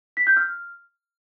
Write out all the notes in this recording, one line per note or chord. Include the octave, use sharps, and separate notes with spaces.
B6
G6
F6